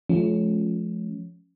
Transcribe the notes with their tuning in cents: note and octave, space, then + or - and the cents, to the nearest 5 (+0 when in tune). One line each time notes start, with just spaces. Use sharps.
F3 +0 A3 -45 C#4 +0